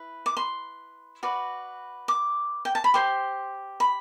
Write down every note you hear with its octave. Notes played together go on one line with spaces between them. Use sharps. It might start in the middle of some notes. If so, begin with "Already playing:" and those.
Already playing: E4 B4
D6
C6
F#4 B4 D5
D6
G5
A5
B5
G4 C5 C6
B5